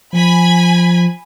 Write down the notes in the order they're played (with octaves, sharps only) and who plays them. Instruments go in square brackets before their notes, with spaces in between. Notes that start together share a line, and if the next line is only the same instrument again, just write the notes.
[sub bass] F3 [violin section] G#5 B5